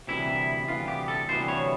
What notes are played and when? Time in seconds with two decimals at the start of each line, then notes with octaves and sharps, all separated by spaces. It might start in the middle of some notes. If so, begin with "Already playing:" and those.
0.07 D2 C3 E3 G3 B3 E4
0.68 D2 C3 E3 G3 B3 F4
0.88 G4
1.08 A4
1.28 D2 C3 E3 G3 B3 C5
1.48 C#5